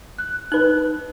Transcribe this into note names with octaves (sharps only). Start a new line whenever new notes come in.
F#6
D#4 B4 F#6